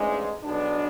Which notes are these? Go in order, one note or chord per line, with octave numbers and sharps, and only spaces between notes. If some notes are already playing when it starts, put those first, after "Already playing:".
Already playing: A1 G#2 G#3 D4
B1 B2 G#3 B3 D4